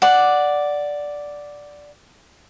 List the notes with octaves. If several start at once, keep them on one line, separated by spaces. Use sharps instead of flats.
D5 F#5